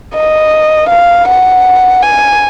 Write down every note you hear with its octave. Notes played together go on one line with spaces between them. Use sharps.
D#5
F5
F#5
G#5